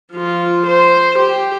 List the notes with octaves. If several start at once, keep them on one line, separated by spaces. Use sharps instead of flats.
F3 F4
C5
G4